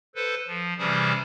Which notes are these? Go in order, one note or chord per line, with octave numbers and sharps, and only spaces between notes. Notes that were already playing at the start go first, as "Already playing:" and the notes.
A4 B4 C5
F3
C3 E3 G3 C#4 G#4 C5